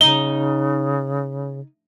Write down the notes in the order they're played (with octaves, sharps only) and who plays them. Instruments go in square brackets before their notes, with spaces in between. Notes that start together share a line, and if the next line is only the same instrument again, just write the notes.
[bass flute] C#3 [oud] D#4 [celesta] G7